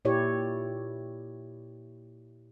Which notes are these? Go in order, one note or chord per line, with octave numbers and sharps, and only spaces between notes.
A#2 E4 G4 C#5 D5